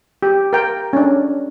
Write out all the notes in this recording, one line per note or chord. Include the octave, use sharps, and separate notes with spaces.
G4
A#4 G5
C#4 D4